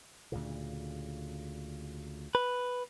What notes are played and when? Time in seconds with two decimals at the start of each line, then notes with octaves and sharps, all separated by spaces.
0.32 D2 A#2 C#3
2.35 B4